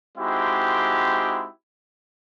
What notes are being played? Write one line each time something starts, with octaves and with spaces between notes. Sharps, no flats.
G#3 C4 D#4 E4 F#4 G4